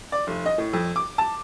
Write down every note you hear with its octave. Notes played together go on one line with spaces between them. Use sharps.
D5
F1
D#5
A2
F2
D6
A5